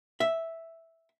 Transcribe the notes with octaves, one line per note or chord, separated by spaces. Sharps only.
E5